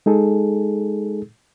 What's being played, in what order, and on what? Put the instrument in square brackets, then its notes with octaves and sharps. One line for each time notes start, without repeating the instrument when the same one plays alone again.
[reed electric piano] G#3 D#4 G#4 A4